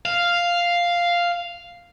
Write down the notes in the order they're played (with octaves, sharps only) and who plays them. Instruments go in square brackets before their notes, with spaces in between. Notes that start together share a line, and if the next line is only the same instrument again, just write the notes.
[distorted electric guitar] F5